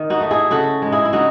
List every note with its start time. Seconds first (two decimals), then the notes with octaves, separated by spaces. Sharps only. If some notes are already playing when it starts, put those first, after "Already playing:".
Already playing: D#3
0.10 D#4 F#4
0.21 A3 D#4
0.31 E4 G#4
0.51 C#3 F#4 A4
0.82 G#3 D#4
0.92 E4 G#4
1.05 E4
1.13 C#3 D#4 F#4